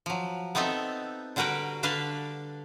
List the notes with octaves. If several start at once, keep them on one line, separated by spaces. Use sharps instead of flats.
F3 F#3
B3 C4 D#4 A4 E5
D3 G3 F#4 A#4 B4 G5
D3 D4 B4 F5 A5